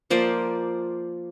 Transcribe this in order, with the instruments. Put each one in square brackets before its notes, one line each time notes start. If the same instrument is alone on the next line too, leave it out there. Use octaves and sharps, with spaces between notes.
[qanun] F3 A#3 C5 D5